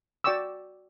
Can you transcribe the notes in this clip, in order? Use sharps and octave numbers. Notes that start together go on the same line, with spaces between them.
F#4 D5 G5 C#6 D6 E6